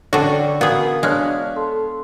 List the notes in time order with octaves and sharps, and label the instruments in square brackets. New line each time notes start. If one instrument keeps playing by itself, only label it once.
[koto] D3 F#4 [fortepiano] C#4 D4 A4 [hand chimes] D5 G5
[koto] B3 G#4 [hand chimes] F#4 A#4 [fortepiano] F5 B5 D#6
[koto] G#3 [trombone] D4 [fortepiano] C#5 F6 F#6 [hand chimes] F5
[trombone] A4 [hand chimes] C6